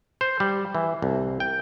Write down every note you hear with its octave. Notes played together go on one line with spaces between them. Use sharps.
C5
G3
E3
C2
G5